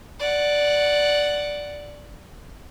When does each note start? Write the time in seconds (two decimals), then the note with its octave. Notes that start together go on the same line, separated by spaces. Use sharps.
0.20 D5 F#5